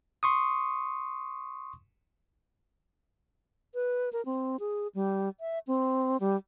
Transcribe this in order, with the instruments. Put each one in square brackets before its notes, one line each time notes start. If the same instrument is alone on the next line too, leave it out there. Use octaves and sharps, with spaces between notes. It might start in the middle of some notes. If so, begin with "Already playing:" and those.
[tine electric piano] C6 C#6 D#6
[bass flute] B4
A#4
C4
G#4
G3
E5
C4
G3